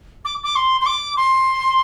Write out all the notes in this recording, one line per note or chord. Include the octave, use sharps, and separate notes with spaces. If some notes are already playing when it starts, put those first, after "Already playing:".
D6
D6
C6
C6
D6
C6